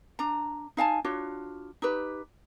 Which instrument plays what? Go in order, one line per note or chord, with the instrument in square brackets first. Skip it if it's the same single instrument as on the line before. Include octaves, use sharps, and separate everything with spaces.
[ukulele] D4 A#5
D#4 F5 G#5 A5
D4 F4 F#4 C#5
D#4 G4 B4